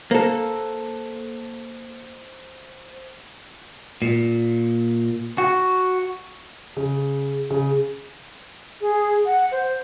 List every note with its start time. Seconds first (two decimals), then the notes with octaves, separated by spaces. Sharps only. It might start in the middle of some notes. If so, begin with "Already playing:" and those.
0.11 A#3 A4 C5
4.02 A#2
5.38 F#4
6.76 C#3
7.50 C#3
8.81 G#4
9.26 F#5
9.52 C5